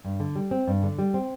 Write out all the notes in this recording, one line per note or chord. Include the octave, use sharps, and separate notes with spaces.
G2
D3
G3
C4
G2
D3
G3
C4